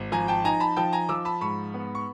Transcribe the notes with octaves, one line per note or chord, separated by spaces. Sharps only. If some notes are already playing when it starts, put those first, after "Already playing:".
Already playing: G#1
F3 G#5 A#5
G5 A5
D#4 G#5 A#5
A5 B5
F3 G5 A5
G#5 A#5
F3 D6 E6
A5 B5
G#2 B5 C#6
B3
C#6